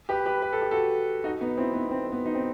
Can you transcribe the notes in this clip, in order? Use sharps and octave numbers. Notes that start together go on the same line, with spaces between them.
G4 B4
G4 B4
B4
A4
G4
F#4 A4
D#4 F#4
B3 D#4
C4 E4
B3 D#4
B3
C4
C4
B3
D#4
C4